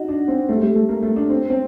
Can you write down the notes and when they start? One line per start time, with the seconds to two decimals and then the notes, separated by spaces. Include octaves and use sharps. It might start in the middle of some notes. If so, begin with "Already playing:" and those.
Already playing: D#4 F#4
0.08 D4
0.28 C4
0.49 A3
0.57 G3
0.62 A3
0.76 A3
0.89 A#3
1.03 A3
1.16 D4
1.30 C4
1.50 C4